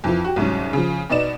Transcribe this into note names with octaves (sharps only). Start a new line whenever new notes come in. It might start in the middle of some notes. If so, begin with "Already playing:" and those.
F2 E3 F3
F#4 G4
C2 G#2 F#3 C#4
C#3 F3
B2 B3 D#4 D5 E7